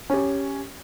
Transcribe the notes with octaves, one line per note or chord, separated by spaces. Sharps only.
C#4 G4